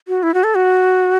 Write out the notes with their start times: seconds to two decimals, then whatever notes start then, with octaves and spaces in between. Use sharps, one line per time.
0.08 F#4
0.23 E4
0.34 F#4
0.44 A4
0.55 F#4